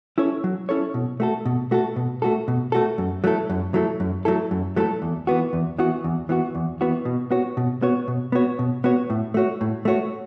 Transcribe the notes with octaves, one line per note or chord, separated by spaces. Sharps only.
C#4 E4 A4 C#5
F#3
C#4 E4 A4 C#5
B2
A3 F#4 A4
B2
A3 F#4 A4
B2
A3 F#4 A4
B2
A3 F#4 A4
F#2
F#3 A3 E4 A4
F#2
F#3 A3 E4 A4
F#2
F#3 A3 E4 A4
F#2
F#3 A3 E4 A4
E2
E3 B3 F#4
E2
E3 B3 F#4
E2
E3 B3 F#4
E2
E3 B3 F#4
B2
B3 F#4 C#5
B2
B3 F#4 C#5
B2
B3 F#4 C#5
B2
B3 F#4 C#5
A2
A3 F#4 C#5
A2
A3 F#4 C#5